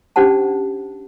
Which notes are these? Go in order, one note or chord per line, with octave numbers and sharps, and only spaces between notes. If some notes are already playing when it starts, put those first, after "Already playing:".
C#4 D4 G4 C5 F#5 A5